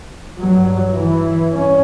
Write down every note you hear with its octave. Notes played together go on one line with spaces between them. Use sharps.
G2 F#3
E3
G2 C#4